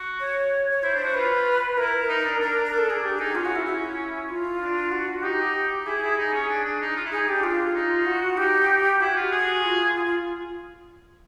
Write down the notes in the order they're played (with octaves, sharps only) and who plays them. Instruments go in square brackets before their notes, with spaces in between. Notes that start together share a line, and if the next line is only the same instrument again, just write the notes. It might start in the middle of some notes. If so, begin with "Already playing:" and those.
Already playing: [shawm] F#4
[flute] C#5
C#5
[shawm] E4 [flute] C5
[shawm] D4
F#4
[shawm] F4 [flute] B4
[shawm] E4 [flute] A#4
[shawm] D#4
D4
[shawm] D4 [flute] A#4
[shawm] D4
[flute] A#4
[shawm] D4
[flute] A4
[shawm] D4 [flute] G#4
[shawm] D4 [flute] G4
[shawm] D#4 [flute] G#4
[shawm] C#4 [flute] F4
[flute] F#4
E4
E4
F4
[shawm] D4
[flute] F#4
[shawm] D#4 [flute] G4
[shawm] E4 [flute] G#4
[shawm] E4
D#4
C#4
D4
D4
D#4
F4
E4
[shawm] D#4 [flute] G#4
[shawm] D4 [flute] G4
[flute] F4
[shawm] D#4
[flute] F#4
[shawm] D#4 [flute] G4
[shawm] E4 [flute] F#4
[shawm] F4
G#4
[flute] F4
F4
F4